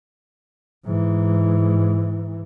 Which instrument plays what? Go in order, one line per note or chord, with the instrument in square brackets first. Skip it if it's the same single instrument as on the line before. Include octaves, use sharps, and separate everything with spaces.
[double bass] G#2 E3